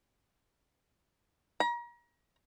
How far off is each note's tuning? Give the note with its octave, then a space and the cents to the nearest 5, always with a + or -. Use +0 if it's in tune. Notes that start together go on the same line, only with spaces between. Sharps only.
A#5 +35